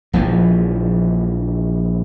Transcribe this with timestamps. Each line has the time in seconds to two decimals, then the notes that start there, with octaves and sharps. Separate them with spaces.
0.13 A#1 E3 F3